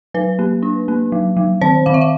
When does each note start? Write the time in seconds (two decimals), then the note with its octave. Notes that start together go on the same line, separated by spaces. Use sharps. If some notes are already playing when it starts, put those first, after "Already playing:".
0.14 F#3 B4
0.39 A#3
0.63 D4
0.88 A#3
1.12 F#3
1.37 F#3
1.61 D#3 C5
1.86 D#3 F5
1.94 E5
2.01 F5